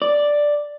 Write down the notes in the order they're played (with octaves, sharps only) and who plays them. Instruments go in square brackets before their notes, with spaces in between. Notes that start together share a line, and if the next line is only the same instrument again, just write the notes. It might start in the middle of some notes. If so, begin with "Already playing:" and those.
[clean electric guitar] D5